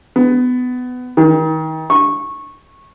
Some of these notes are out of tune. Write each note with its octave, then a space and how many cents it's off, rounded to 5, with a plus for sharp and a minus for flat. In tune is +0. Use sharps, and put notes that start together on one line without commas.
B3 +20
D#3 +30
C#6 -15